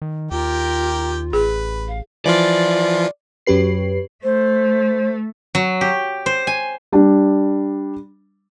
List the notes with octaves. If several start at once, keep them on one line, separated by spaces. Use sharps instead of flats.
D#3
D#2 F4 G4 A#4 G5
A1 G#4 B4
F5
E3 F3 F4 D5
F#2 F#3 C#4 G4 B4 C7
A3 C5
F#3
G4
C5
G#5
G3 D4